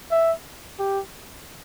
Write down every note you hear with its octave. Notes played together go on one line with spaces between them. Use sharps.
E5
G4